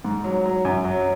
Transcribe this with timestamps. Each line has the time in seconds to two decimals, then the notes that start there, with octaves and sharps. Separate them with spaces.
0.04 G#2
0.24 F#3
0.46 F#3
0.65 F#2
0.85 F#3